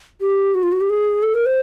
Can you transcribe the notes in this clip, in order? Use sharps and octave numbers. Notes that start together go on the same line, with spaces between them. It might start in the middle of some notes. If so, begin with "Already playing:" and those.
G4
F#4
F4
F#4
G4
G#4
A4
A#4
C5